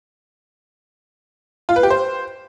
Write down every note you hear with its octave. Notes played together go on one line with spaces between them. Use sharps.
F4
B4
G4
C5